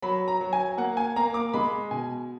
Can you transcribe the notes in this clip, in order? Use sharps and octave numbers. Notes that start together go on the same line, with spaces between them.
F#3 B5
A#5
F#3
G#5
A#3 F#5
G#5
A#3 A#5
D6
G#3 B5
B2 G#5